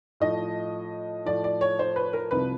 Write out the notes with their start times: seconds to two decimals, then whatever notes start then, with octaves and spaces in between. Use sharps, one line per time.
0.20 A2 F3 D#5
1.25 A2 F3 D5
1.44 D5
1.61 C#5
1.79 C5
1.96 B4
2.13 A#4
2.31 C2 C3 F3 B4